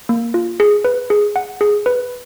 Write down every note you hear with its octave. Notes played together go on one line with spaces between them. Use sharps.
A#3
F4
G#4
B4
G#4
F#5
G#4
B4